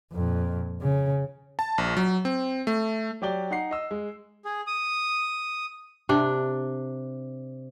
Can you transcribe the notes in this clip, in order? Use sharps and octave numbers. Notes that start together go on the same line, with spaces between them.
F2 A#2
C#3
A5
A#1
F#3
C4
A3
F#3 G4 D5 G7
D#4 F#5 C7
D#5 E6
G#3
G#4
D#6
C3 D4